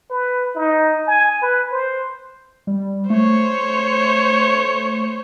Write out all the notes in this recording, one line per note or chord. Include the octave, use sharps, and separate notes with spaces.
B4
D#4
G#5
B4
C5
G3
A3 C5 C#5